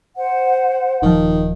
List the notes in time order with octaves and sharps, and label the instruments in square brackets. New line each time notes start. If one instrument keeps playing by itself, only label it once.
[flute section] C5 F#5
[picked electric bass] D#1 F3 [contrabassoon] D#3